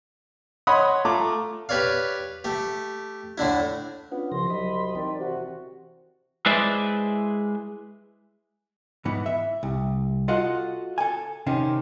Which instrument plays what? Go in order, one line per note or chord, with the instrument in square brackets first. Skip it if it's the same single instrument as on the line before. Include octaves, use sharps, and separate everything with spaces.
[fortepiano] C#5 D#5 F#5 B5 C6 D#6
A3 F4 A#5 D6
[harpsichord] G4 B4 C#5 D5 F5
A3 G4
A2 D3 D4 E4
[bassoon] B3 [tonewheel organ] C#4 D4 F4
[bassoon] C2 [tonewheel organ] C#3 F3 A#6 [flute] C6
[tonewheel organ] F#3 D#5 B5
[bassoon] D#3 [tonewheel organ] E3 C4 [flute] D5
[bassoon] C3 [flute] F#4
[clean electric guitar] G#3 E4 B4 C5 D5 E5
[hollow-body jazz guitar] G#2 E3 B3
E5
C2
F4 F#4 A4 D#5 F5 F#5
A4 G#5
C3 D#3 C4 C#4